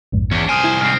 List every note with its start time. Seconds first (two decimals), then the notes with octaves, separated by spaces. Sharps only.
0.12 A#1 F2 G#2
0.31 E2 C#4 D4
0.49 C2 C5 G#5 D#6 F6 D7
0.64 E4 G#6 E7
0.81 G#2 C4 F6 C7